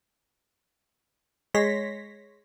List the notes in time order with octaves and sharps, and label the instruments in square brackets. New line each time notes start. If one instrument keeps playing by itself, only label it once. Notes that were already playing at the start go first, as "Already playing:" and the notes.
[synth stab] G#3 C#5 C6 A#6 B6